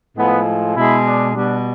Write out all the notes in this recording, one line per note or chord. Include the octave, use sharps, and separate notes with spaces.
A2 F3 G#3 B3
B2 G#3 E4
D4
B2 G3 D4